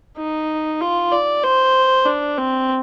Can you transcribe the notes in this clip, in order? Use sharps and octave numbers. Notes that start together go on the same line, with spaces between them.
D#4
F4
D5
C5
D4
C4